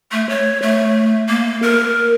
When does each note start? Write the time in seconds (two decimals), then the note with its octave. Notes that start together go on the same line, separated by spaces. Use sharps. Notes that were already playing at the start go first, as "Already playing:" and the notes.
0.12 A3
0.29 C#5
0.62 A3
1.29 A#3
1.62 A#4